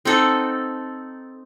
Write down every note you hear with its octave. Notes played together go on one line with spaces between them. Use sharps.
C4 D#4 A4 F#5